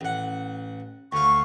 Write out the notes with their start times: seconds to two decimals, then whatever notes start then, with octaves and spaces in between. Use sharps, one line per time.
0.01 A1 F#5
1.12 D2 F5 C#6